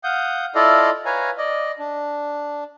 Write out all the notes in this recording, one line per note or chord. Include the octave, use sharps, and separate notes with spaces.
F5 F#5 D#6 G6
E4 F4 A4 D5 D#5 F5
B4 C#5 F5 G#5 A#5
D5 D#5
D4